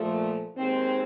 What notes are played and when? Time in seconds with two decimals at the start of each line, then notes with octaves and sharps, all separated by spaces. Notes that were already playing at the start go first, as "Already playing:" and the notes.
Already playing: A#2 F3 A3
0.55 D#2 D#3 G#3 C4